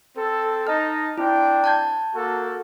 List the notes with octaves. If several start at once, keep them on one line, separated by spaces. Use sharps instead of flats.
C4 A4
D#4 D#5 A5 F6
C4 D4 E4 G5
A5 G6 G#6
A#3 F#4 A4